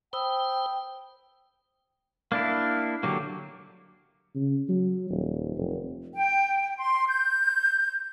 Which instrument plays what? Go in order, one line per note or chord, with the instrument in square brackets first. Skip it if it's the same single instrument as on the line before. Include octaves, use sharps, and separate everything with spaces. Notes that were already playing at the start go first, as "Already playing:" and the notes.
[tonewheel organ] C5 [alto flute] G5 [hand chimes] B5 D#6 E6
[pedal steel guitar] A#3 D4 E4 [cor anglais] F5
[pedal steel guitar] D3 F#3 A#3 [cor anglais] G4
[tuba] C#3
F#3
D#1
F1
[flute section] G5
C6
G6